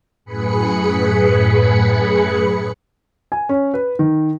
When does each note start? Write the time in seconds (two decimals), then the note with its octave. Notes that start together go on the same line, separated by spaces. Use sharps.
0.25 F#2 A2 G#4 B4 B5 C#7
3.32 G#5
3.49 C#4
3.74 B4
3.99 D#3